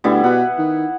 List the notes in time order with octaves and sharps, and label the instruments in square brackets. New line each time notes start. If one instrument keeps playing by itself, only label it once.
[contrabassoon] D2 [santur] G3 B3 E4
[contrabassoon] B2 [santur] B4 F#5
[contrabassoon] D#3